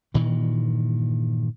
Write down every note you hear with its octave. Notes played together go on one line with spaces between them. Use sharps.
G2 A#2 D#3 E3